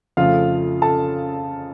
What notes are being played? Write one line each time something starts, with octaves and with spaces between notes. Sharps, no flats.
F2 C#3 F3 A3 F4 F5
A4 A5